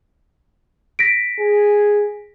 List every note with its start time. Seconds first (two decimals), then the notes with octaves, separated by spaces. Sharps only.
0.99 A#6 B6 D7
1.39 G#4